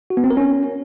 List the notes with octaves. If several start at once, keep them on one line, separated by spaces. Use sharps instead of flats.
F#4
B3
C4
A#4
C#4